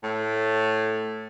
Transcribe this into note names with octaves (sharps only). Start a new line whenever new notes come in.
A2